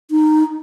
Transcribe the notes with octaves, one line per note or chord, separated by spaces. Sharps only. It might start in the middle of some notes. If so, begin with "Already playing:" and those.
D#4